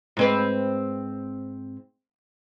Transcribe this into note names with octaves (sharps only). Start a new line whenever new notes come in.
G#2 C4 B4